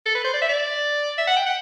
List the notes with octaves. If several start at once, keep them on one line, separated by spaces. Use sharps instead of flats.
A4
B4
C5
D5
E5
D5
E5
F#5
G5
F#5